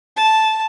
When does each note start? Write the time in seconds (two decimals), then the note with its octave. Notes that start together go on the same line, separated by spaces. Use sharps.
0.16 A5